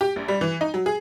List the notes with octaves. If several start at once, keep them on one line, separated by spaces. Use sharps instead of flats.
G4
A#1
G3
E3
D#4
F#3
G#4